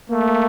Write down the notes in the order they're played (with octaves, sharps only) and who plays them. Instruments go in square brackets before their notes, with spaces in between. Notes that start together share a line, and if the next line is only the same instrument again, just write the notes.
[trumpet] A3 [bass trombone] A#3